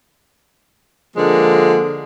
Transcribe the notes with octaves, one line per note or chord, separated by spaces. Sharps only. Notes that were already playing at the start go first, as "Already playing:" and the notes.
D3 F3 G#3 A#3